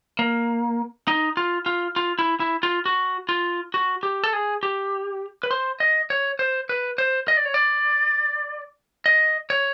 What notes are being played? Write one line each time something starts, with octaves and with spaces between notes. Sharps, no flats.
A#3
D#4
F4
F4
F4
E4
E4
F4
F#4
F4
F#4
G4
A4
G#4
G4
B4
C5
D#5
C#5
C5
B4
C5
D#5
D5
C#5
D5
D#5
C#5